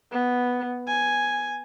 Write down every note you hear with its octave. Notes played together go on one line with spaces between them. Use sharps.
B3
G#5